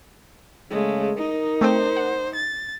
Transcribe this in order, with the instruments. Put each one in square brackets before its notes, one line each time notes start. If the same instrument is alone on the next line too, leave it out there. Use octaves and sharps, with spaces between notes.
[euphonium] C#3 [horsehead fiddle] G#3 A3
[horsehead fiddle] D#4 [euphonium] A#4 [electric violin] D#5
[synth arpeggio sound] A3 C4 G5 [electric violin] C5
[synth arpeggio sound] F#5
[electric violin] A6